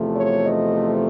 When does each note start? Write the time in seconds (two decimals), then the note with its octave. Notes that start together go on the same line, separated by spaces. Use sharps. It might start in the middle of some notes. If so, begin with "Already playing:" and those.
Already playing: E2 C3 F3 A3
0.14 C#5
0.45 D#5